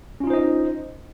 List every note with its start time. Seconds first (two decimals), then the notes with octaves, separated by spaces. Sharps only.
0.20 C#4
0.24 F4
0.27 D#4
0.30 C5
0.33 D#5